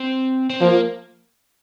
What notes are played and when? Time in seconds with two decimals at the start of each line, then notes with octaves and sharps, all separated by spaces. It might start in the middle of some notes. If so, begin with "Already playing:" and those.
Already playing: C4
0.50 C4
0.60 F3 A#3